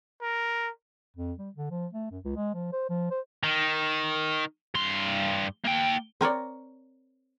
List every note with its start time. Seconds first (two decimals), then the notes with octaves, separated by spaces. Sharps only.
0.22 A#4
1.16 F2
1.39 G3
1.55 D3
1.71 F3
1.93 A3
2.11 F#2
2.24 C#2
2.36 G#3
2.54 F3
2.72 C5
2.90 F3
3.11 C5
3.44 D#3
4.75 G2 C6
5.65 A#3 G5
6.21 C4 A#4 C#5 D5